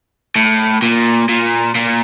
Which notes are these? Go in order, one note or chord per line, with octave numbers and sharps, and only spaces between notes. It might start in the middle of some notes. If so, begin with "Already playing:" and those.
A2
A#2
A#2
A#2